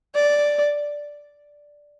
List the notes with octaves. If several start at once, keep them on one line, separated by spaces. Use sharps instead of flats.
D5